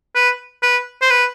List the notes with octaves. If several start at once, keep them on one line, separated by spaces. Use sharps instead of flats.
B4
B4
C5
B4